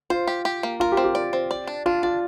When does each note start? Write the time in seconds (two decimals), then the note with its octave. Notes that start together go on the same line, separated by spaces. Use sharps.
0.10 F4 C5
0.27 G4
0.45 G4
0.63 A#3
0.80 F4 A#4
0.92 G4
0.97 C4
1.04 G4
1.15 D5
1.33 C4
1.51 D5
1.67 D4
1.86 D4 F4
2.03 F4 D5